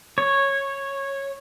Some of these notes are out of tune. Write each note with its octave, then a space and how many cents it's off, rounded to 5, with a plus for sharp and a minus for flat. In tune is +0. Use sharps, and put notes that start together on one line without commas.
C#5 -10